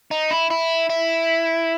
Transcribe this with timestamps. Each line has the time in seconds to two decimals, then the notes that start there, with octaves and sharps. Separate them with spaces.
0.11 D#4
0.31 E4
0.50 E4
0.90 E4